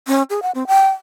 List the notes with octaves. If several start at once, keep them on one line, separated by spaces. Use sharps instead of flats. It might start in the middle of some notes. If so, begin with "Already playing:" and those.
C#4
G#4
F#5
C4
G5